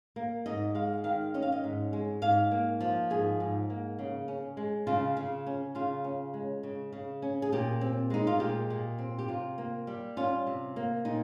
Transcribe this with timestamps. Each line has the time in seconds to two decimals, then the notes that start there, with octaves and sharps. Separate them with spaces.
0.16 A#3
0.46 G#2 D#5
0.75 G#3 F5
1.04 D#3 F5
1.34 C#4 D#5
1.42 F5
1.52 D#5
1.64 G#2
1.93 G#3
2.22 G#2 F5
2.51 A#3
2.80 F3
3.10 G#2 G#4
3.40 G#2
3.70 A#3
3.99 C#3
4.28 C#4
4.57 G#3
4.87 C#3 F4
5.17 C#3
5.46 C#4
5.75 C#3 F4
6.04 C#4
6.34 G#3
6.63 C#3
6.93 C#3
7.22 C#4
7.42 G#4
7.52 A#2 G4
7.81 C4
8.10 G#3 D#4
8.27 F4
8.39 A#2 G4
8.70 A#2
8.99 C4
9.19 G4
9.28 C3 F4
9.58 A#3
9.87 G3
10.17 C#4 F4
10.47 C3
10.76 A#3
11.05 A#2 D#4